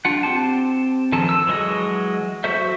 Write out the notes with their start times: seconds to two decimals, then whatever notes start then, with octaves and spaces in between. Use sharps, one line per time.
0.05 D4 F4 F#5
0.23 C4 G4 A5
1.12 D#3 F3 A4
1.29 E6
1.47 E3 F#3 G#3 F#4 D#5
2.44 F#3 F#4 A4 C5 E5